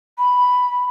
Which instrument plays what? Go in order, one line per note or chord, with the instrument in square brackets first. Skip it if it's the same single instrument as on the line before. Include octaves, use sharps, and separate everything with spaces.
[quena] B5